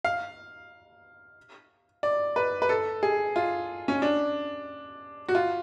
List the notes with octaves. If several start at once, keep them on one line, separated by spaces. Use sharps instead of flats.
F5
D5
B4
B4
A4
G#4
F4
C#4
D4
F#4
F4